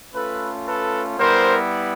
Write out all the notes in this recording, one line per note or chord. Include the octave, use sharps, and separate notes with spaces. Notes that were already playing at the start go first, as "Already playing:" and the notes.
A3 C#4 F4 A4 B4
A4 B4
G3 B3 E4 A#4 C5